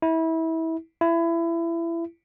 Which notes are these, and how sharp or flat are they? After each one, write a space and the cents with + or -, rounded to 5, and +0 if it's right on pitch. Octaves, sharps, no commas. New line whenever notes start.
E4 -25
E4 +25